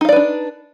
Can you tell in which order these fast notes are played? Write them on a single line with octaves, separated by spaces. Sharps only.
D#4 F5 D5 B4 D4